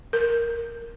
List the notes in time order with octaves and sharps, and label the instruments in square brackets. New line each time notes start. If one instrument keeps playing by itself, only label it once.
[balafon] A#4